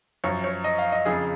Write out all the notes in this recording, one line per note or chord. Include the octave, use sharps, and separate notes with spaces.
F#2 F3 C#5
C#5
D#5
F5
D#5
F2 C#3 F3 G#4